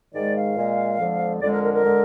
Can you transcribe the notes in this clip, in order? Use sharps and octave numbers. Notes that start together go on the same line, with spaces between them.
G#2 D#3 G#3 D5
F5
A#2 G#3
F2 D3 F3 G#3
F2 D3 G#3 D5
A#4
A#4
A#4
D3 G#3